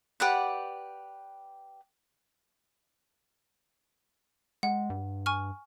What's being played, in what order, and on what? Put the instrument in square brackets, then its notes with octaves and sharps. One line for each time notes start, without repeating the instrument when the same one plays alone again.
[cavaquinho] G4 B4 D5 F#5
[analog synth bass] G#3 [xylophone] F#5
[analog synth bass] G2
[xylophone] G#5 C#6 F6